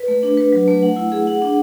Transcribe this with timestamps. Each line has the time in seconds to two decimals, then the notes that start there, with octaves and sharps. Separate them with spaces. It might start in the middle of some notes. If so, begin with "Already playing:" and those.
Already playing: B4
0.08 A3
0.23 D4
0.37 B4
0.52 F#3
0.68 A3
0.83 F#5
0.96 E4
1.12 G#4
1.27 F#5
1.42 D4